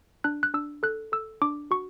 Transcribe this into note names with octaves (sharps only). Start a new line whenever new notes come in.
D4 F#6
F#6
D4 E6
A4 F#6
A4 E6
D4 D6
F#4 C#6